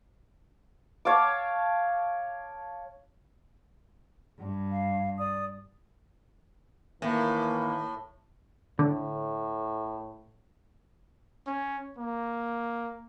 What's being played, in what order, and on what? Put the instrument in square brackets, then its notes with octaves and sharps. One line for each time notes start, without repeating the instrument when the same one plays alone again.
[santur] C#5 F5 A5 D6
[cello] G2
[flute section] F5
D5 D#6
[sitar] A2 [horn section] D#3 E3 A#3
[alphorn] A2 [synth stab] D3
[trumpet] C#4
A#3